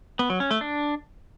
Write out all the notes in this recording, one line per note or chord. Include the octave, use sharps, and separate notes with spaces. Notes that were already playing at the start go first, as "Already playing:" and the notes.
B3
F#3
C#4
A3
D4